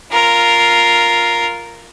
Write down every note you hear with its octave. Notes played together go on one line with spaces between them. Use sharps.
F4 A#4